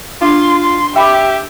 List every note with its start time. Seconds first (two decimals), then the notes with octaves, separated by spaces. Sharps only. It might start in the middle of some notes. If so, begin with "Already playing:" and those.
0.22 D4 F4 C6
0.62 C6
0.96 G4 E5 G5 B5 D6